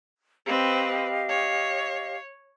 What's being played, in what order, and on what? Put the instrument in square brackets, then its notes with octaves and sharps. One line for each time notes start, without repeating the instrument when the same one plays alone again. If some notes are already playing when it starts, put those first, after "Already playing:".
[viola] C4 B4 [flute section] G4 D#5 F5
[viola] C#5